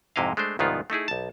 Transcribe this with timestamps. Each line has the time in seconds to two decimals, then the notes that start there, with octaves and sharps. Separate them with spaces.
0.16 F2 G#2 C3 E4 D#5 F5
0.37 G#3 A3 D4 C5
0.59 C2 G#2 D#3 F3 B3 F4
0.90 A3 D#4 E4 G#4
1.08 B1 A5